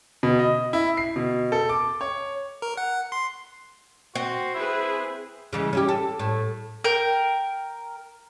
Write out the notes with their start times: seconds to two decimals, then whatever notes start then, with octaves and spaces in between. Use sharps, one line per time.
0.23 B2
0.39 D#5
0.73 E4
0.97 C7
1.16 B2
1.52 A4
1.69 D6
2.01 C#5
2.62 A#4
2.77 F#5
3.12 C6
4.15 C4 F#4
4.55 E4 G#4 B4 C5
5.53 C#3 E3 G#3
5.73 C#4 E4 G4
5.89 A4
6.19 A2
6.84 A#4 G5